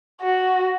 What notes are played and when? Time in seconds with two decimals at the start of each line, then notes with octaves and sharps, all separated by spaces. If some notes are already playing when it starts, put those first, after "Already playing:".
0.21 F#4